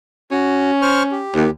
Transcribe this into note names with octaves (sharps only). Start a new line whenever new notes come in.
C#4 F#4
C5 C#6 F6
G4
D#2